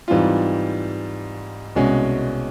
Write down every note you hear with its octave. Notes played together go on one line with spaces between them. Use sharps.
G#2 E3 G3 C4 F4
C2 B2 G#3 C#4 F#4